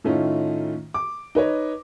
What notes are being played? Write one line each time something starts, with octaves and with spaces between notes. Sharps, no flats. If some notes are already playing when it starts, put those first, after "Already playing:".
A2 D#3 A3 C#4 D#4 F4
D6
D#4 B4 C#5 D#5